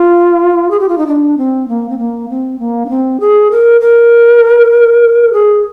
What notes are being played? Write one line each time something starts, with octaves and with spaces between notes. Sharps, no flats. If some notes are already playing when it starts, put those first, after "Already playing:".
Already playing: F4
G#4
G4
F4
D#4
D4
C4
A#3
C4
A#3
C4
A#3
D4
C4
G#4
A#4
A#4
G#4